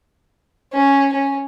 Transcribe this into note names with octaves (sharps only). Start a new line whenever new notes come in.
C#4
C#4